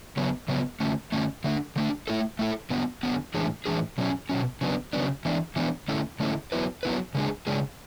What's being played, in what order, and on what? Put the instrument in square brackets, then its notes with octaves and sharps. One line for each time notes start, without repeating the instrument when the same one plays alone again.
[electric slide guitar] C#3 F#3 B3
C#3 F#3 B3
D3 A3 C#4
D3 A3 C#4
D3 A3 D4
D3 A3 D4
A3 E4 A4
A3 E4 A4
D3 F#3 B3
D3 F#3 B3
A2 E3 G#3 D4 G#4
A2 E3 G#3 D4 G#4
B2 F#3 C#4
B2 F#3 C#4
C#3 F#3 B3 D4
C#3 F#3 B3 D4
E3 B3 D4
E3 B3 D4
D3 A3 C#4 E4 A4
D3 A3 C#4 E4 A4
F#3 B3 E4 B4
F#3 B3 E4 B4
C#3 G#3 D4 G#4
C#3 G#3 D4 G#4